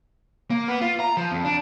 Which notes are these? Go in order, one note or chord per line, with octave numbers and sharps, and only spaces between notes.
A#3
B3
F4
A#5
F3
F2
D4